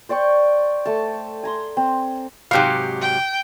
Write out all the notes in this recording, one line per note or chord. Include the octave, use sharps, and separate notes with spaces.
C5 D5 G5 C#6
A3 A5
G#5 A#5 C6
C4
G#2 C3 F#3 G4 F5
G5